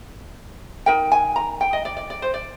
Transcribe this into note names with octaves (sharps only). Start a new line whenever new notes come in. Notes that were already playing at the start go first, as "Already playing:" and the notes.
D#4 A#4 G5
G#5
A#5
G5
D#5
D5
D5
D5
C5
D5